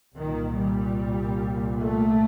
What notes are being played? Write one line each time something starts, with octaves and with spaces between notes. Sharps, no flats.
C2 A#2 D#3
G3
A3